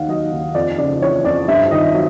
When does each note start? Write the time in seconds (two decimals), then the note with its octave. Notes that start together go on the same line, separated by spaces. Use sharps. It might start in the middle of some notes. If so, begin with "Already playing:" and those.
Already playing: D#2 D#3 F5 F#5
0.08 F#3 D#5
0.32 D#2
0.55 F2 D5
0.78 C#3 D5
1.01 E3 C#5
1.24 F2 D5
1.48 G2 E5
1.71 D#3 D#5
1.94 F#3